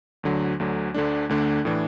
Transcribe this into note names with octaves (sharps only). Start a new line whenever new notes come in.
D2 D3 F#3
D2 D3 F#3
D2 D3 A3 D4
D2 D3 A3 D4
A2 E3 D4